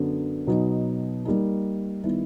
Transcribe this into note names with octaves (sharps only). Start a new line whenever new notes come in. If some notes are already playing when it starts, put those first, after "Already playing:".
Already playing: F#2 D3 F#3 B3
B2 F#3 B3 D#4
G3 A#3 D#4
D#3 G3 B3 E4